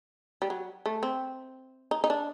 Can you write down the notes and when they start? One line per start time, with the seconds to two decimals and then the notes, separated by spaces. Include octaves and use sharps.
0.42 G3
0.50 F#3
0.86 A3
1.03 C4
1.91 D#4
2.04 D#4
2.10 D4